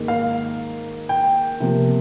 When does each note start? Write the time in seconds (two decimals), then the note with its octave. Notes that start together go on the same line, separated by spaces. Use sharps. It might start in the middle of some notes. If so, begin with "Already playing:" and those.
Already playing: G#2 D#3 A#3
0.08 F5
1.09 G5
1.60 C3 F3 A#3